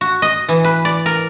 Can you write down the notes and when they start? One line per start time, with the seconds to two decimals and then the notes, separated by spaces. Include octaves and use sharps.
0.01 F#4
0.22 D#5
0.49 E3
0.64 B4
0.85 D5
1.06 A#4